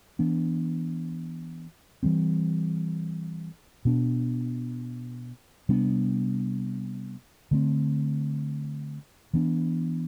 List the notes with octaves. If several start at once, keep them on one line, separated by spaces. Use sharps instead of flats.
E3 B3 D4
E3 G3 C4
B2 B3 D4
C3 G3 B3 D4
D3 A3 C4
E3 B3 D4